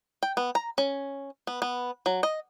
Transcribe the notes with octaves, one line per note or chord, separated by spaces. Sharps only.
G5
B3
A#5
C#4
B3
B3
F#3
D#5